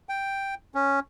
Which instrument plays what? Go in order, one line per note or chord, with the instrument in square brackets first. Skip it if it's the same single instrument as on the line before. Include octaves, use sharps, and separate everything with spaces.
[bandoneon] G5
C#4